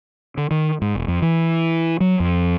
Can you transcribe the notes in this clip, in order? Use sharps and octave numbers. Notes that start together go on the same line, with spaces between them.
D3
D#3
G#2
E1
F2
E3
F#3
F2